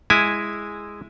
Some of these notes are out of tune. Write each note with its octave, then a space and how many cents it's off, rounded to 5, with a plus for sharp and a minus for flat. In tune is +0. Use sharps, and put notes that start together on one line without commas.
G#3 -5 E4 +0 G#5 +0